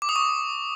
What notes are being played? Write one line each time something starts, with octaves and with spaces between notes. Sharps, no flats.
D6
D#6
C#6